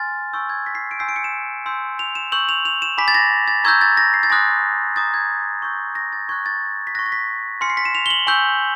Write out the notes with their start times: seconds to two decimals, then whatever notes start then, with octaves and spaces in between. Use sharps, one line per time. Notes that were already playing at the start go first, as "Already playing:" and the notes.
Already playing: G#5 C6 F6 A6
0.34 G#5 C#6 E6 G6
0.49 G#6
0.66 B6
0.75 C7
0.91 D7
0.99 G#5 C6 E6 G6 C7
1.09 D7
1.16 C#7
1.24 E7
1.66 G#5 C6 E6 G6
1.99 F7
2.15 E7
2.32 C#6 E6 G6 F#7
2.49 F7
2.65 F7
2.82 E7
2.98 G#5 B5 D6 B6
3.08 A6
3.14 A#6
3.48 A6
3.64 A#5 C#6 E6 G6 G#6
3.81 A6
3.97 A#6
4.14 C7
4.23 A6
4.30 G#5 C6 D#6 F#6 A#6
4.96 A#5 D#6 G6 A6
5.14 G#6
5.62 C#6 E6 G6
5.95 A#6
6.13 A6
6.29 C#6 F#6 G#6
6.46 A6
6.87 B6
6.95 F#6 A#6
6.99 C#6
7.06 A#6
7.12 B6
7.61 G#5 C6 F6 C#7
7.70 C7
7.77 B6
7.85 E7
7.95 F7
8.06 G7
8.10 F#7
8.27 G#5 C#6 E6 G6 G7